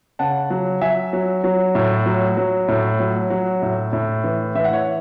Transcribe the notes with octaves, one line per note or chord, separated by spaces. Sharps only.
C#3 F#5 A5
F#3
F#3 E5 G#5
F#3
F#3
A2
F#3
F#3
A2
F#3
F#3
A2
A2
E3
E3 E5
F#5
C#5 E5